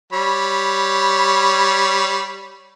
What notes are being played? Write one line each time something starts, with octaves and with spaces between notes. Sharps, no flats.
G3 C#5 B5